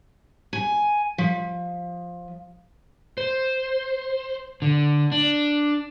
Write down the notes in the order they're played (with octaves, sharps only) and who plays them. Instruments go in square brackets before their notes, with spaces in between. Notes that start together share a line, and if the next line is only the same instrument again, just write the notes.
[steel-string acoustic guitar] G#5
F3
[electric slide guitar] C5
D3
D4